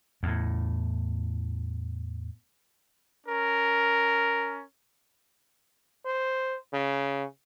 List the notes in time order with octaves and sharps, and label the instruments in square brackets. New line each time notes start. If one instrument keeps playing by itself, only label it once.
[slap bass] E2 A2
[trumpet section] C#4 A#4
[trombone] C5
C#3